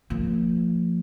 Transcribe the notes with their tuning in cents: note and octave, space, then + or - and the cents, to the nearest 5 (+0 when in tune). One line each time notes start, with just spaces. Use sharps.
F3 +0 A#3 -45